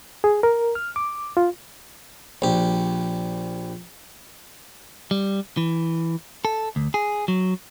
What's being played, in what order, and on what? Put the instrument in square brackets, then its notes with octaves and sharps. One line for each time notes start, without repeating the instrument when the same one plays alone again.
[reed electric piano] G#4
A#4
F6
D6
F4
[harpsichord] A#1 G4
[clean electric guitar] G3
E3
A4
D2
G#4
F#3